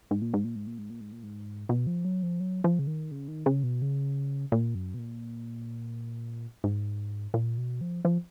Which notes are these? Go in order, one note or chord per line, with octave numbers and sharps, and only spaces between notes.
G#2
A#2
G#2
A#2
G#2
A#2
G#2
A#2
G#2
A#2
G#2
B2
F3
F#3
F3
F#3
F3
C#3
D#3
C#3
D#3
C#3
B2
C#3
A#2
F#2
B2
A#2
G#2
A#2
B2
F3
F3